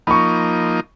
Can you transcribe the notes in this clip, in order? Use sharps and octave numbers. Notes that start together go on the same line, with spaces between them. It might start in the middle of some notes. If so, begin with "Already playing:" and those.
F3 A#3 D#4 B5 C#6